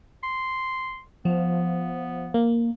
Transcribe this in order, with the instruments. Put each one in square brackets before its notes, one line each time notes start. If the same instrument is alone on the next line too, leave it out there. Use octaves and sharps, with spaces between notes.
[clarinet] C6
[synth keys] F3 [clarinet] B3
[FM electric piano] A#3